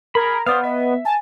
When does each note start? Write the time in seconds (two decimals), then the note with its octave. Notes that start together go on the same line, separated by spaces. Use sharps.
0.15 G#4 A#4 B5
0.46 B3 C5 D5 F5 D#6
0.63 D#5 E5
1.05 G#5 A5